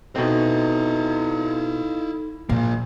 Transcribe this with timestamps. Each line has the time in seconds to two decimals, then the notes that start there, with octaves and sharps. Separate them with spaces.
0.16 B2 C4 D#4 E4 A4 D#5
2.49 A#2 F3 A#3